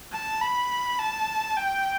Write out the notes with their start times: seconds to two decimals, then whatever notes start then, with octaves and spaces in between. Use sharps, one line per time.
0.13 A5
0.41 B5
0.99 A5
1.57 G5